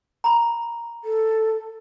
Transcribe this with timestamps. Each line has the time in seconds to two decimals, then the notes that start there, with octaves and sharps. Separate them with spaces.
0.24 A#5 B5
1.04 A4